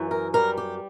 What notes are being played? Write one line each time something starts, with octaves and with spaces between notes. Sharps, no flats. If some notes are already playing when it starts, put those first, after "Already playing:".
Already playing: F#2 E3
A#4
G3 A#4
G4